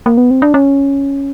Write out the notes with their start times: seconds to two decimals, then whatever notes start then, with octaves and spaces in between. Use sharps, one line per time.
0.06 A#3
0.17 B3
0.31 C4
0.42 D4
0.54 C#4